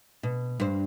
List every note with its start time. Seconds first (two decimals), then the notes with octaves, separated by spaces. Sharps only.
0.23 B2
0.60 G2 C5